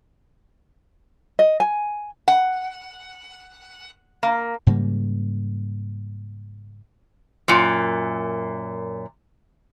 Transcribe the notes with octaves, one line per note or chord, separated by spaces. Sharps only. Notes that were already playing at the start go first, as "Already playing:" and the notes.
D#5
G#5
F#5
A#3
G#2 C#3 G3 A#3
F#2 A#2